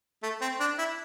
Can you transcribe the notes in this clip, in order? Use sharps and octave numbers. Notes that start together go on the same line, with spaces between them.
A3
C4
D4
E4